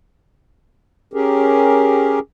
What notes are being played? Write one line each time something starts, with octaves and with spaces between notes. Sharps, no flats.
C#4 G4 G#4 A#4